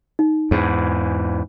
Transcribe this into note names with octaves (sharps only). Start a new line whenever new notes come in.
D#4
E2 G#2